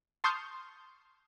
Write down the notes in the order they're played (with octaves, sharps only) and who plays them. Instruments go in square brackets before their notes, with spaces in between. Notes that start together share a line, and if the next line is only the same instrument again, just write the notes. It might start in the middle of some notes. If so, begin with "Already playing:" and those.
[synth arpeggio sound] A5 C6 C#6 D#6 F6 G6